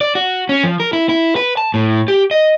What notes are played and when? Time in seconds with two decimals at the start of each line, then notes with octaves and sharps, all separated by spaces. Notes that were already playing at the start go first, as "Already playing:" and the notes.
0.01 D5
0.15 F#4
0.49 C#4
0.63 F3
0.80 A#4
0.93 E4
1.09 E4
1.36 B4
1.57 A5
1.74 A2
2.08 G4
2.31 D#5